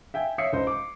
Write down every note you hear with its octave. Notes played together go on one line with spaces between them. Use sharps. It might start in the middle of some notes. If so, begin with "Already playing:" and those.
E5 G5 G#5
C#5 E5 D#6 C7 C#7
C#2 C5 D#5
D6